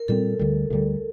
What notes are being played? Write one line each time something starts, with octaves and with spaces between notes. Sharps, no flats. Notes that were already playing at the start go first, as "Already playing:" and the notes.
Already playing: A#4
A#2 G3 C4 A4
D2 D3 G3
D2 D3 G3